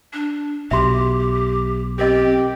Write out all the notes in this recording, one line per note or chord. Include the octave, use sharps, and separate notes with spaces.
D4
B1 B2 G4 E5 C6
C4 G4 A#4 D#5 D6